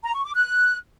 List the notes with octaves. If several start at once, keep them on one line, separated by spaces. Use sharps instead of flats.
A#5
C#6
D6
F#6